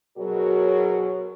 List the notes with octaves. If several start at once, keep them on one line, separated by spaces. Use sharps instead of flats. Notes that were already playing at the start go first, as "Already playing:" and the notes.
B2 F#3 F#4 G#4 A#4 C#5